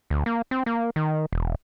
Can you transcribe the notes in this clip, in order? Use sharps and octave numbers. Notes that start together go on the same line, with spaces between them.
D2
A#3
C4
A#3
D#3
E1